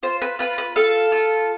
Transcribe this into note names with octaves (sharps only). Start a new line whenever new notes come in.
F4 C5
B4
F4 B4
B4
A4 F5
F4